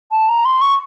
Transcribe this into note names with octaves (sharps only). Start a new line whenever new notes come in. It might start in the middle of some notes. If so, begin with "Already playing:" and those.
A5
A#5
C6
C#6